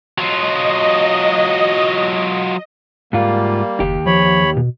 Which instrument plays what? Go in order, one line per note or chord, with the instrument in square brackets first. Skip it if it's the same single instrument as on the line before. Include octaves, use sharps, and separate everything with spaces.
[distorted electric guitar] F#3 F4 [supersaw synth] D#5
[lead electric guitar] G#2 F4 [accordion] G3 A#3
[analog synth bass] F#1 [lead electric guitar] D#2 G4
[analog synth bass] F3 [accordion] C#5 B5
[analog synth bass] B2